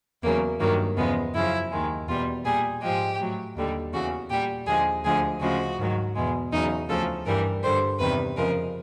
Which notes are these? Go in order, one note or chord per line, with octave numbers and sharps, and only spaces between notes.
E2 C#3 F#3 A#3
G2 D#3 F#3 A#3
E2 C#3 F3 G#3 B3
F#2 C#3 F3 E4
D#2 D#3 G#3
E2 B2 G3 F4
A#2 G3 G#4
G#2 F3 G#3 G4
A2 F#3
D#2 D3 G3
E2 C#3 E3 F#4
A#2 G3 G4
D#2 D3 F3 G#3 G#4
D2 D3 F3 G#3 G#4
D2 C#3 F3 G#3 F#4
G#2 D#3 F#3
E2 B2 G#3
E2 C#3 F#3 D#4
D2 C#3 F3 A4
G2 E3 G3 A#4
G2 D3 G3 C5
E2 C3 D#3 G3 B4
F2 C#3 F3 G#3 A#4